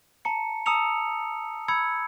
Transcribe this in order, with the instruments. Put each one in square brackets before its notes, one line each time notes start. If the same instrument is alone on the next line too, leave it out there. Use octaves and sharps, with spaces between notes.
[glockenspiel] A5 A#5 C#7
A5 A#5 D#6 E6 C#7 F7
B5 E6 G#6 C#7